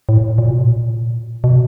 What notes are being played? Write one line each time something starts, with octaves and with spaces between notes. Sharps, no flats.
A2
A#2
B2
A#2
B2